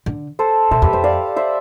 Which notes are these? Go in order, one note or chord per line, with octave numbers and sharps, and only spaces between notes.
D3
A4 C5
B2 C5 E5
E2 G4 B4
F2 C5 E5
D5 F5
C5 E5